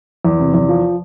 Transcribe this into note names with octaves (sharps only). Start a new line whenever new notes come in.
E2
C3
E2
F3